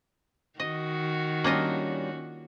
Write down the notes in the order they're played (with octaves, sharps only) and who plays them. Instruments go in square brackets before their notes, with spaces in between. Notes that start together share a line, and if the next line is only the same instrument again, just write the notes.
[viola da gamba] D#3 F#4 [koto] D#5
[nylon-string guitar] G3 C#4 D4 [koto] A#3 F4 D#5